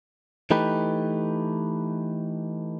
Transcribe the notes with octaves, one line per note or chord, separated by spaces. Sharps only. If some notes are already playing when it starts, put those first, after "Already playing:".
E3 A3 D#4 G4 B4